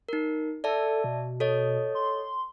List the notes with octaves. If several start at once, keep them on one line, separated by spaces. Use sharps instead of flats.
D#4 A#4
A4 D5 E5 A5
B2
A4 C#5 D#5
C6